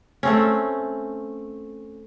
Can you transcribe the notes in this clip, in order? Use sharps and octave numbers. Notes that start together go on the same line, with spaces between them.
A3 C4 C#4